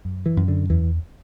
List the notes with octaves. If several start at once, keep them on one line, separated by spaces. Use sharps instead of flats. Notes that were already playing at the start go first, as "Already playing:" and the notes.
F#2
E3
F#2
D3
E2 E3